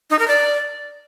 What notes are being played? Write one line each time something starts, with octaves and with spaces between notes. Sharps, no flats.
D#4
A#4
D5